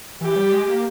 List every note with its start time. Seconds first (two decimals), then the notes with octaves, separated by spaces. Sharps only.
0.21 E3 G4
0.36 G3
0.52 G#3
0.68 A#3